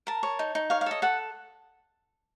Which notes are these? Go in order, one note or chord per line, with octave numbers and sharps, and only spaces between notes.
A#4 A5
C#5
D#4
D#4
C#5 F5
F5
A4 D#5
A4 F#5